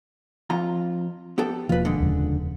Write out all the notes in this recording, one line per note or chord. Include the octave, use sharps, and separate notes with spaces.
F2 F4 A#5
B3 G4 A4
E1 F3 A#3 F4 B4
D3 G#3
D#1 F2 C#3